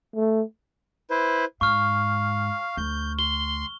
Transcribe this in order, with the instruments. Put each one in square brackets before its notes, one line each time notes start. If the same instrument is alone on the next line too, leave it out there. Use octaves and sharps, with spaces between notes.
[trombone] A3
[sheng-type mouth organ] E4 B4 C5
[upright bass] G#2 [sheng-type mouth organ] F5 [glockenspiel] C#6 F6
[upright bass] D2 [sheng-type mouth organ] G6
[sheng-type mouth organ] C6 [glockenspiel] G7